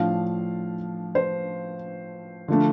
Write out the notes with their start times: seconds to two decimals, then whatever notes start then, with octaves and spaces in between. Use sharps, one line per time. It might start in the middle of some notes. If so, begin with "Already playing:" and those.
Already playing: A2 F3 D4 F5
1.15 C5
2.48 D3 F3 A3 D4